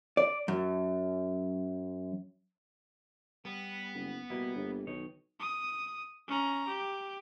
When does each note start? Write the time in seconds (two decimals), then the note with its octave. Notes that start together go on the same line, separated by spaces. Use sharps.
0.17 D5
0.48 F#2
3.45 G3 B3
3.94 F#1
4.30 B2 G3 A#3 E4
4.55 G1
4.87 B1 D#3 D#4 C#5
5.40 D#6
6.28 C#4 A#5
6.68 G4